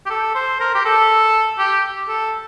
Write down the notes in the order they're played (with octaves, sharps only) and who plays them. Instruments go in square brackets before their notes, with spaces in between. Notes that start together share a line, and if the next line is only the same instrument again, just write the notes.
[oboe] G4
A4
C5
A#4
G4
A4
G4
A4